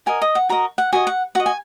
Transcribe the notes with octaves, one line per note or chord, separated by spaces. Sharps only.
F#4 A#4 D#5 G#5
D#5
F#5
F#4 A#4 D#5 A#5
F#5
F#4 D#5 G#5
F#5
F#4 D#5 F#5
G#5